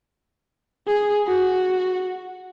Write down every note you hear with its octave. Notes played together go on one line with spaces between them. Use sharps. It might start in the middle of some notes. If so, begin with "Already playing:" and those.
G#4
F#4